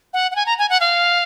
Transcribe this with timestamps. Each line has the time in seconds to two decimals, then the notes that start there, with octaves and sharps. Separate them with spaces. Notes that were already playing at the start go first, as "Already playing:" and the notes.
0.14 F#5
0.31 F#5
0.36 G#5
0.46 A#5
0.58 G#5
0.70 F#5
0.81 F5